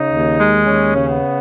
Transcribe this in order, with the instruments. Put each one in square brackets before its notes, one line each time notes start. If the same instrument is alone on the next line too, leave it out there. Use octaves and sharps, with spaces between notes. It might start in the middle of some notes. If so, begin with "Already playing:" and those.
Already playing: [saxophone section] C#3 [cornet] D#4
[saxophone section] D#2
G#3
[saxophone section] D#2 [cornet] C#4
[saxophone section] C#3
[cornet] B3